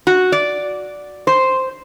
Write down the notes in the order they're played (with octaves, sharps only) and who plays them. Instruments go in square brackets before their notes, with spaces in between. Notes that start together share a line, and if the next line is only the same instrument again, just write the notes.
[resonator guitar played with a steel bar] F#4
D5
C5